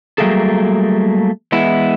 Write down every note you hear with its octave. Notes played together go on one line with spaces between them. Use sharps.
F#3 G3 A3 A#3 G#4 A4
E3 G#3 B3 E4